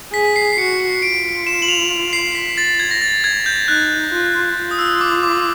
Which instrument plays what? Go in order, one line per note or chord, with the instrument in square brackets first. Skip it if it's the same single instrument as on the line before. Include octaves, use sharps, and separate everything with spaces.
[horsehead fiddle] G#4 [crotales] B6
[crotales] C7
C7
[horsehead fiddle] F#4 [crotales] C#7
[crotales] C#7
[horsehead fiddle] F4 [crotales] D7
[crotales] E7
F#7
F7
C7
B6
A6
G#6
A#6
A6
G#6
G6
[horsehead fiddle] D#4 [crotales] F#6
[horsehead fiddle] F4
F4
[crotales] D#6
E6
D6
D6